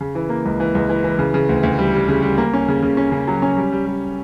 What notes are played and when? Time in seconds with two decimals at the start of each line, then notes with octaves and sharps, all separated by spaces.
0.01 C#3
0.15 E3
0.29 A#3
0.45 C#2
0.60 E3
0.75 C#2
0.89 E3
1.04 E3
1.19 C#3
1.34 C#3
1.49 D2
1.63 D2
1.79 G3
1.94 G3
2.08 C#3
2.23 G3
2.38 A#3
2.53 C#4
2.68 C#3
2.82 C#3
2.97 C#4
3.12 C#3
3.28 F#3
3.42 C#4
3.57 G3
3.72 G3
3.86 G3